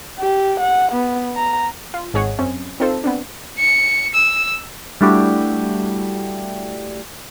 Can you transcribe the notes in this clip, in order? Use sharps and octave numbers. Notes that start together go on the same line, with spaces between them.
G4
F#5
B3
A#5
F4
G#1 G#2 G#4 C#5 D#5 F#5
F#2 C4 C#4
C4 D#4 F4 A4 C5
B3 C4 D4
C#7
E6
G3 A3 D4 E4 F#4 G4